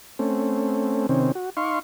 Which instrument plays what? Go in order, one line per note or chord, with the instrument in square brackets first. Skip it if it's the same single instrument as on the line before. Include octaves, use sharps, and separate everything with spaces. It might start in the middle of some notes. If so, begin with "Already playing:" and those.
[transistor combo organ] A3 C4 C#4
C3 D#3 C4 C#4
F#4
D#4 F5 C6 C#6